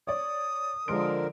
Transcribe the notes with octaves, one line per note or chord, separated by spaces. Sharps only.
C#5 D5 D#6
D3 F3 G#3 A#4 C6 D7